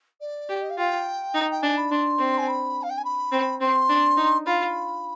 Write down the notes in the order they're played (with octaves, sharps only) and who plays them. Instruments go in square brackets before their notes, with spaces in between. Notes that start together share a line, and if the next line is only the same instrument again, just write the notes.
[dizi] D5
[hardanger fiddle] G4
[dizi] D#5
F5
[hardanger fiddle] F4 [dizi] G5
[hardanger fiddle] D#4
[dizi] G5
[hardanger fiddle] D4 [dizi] G#5
[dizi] B5
[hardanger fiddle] D4 [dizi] C6
[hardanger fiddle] C4
[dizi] G#5
B5
F5
G5
G#5
B5
[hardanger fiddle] C4
[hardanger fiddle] C4 [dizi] C6
[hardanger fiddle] D4
D#4
[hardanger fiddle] F4 [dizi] B5